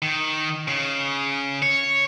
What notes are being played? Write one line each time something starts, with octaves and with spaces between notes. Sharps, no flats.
D#3
C#3
C#5